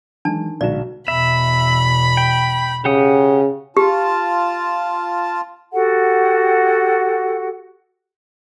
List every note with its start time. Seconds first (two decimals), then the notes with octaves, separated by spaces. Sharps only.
0.25 D#3 E3 F#3 G#3 D4 A5
0.61 B1 A#2 D3 G#3 F#4 D5 E7
1.08 E2 B2 E5 B5
2.17 G5
2.85 C#3 G4 F#5 D#6
3.77 F4 G4 A5
5.72 F#4 G4 A4 F#5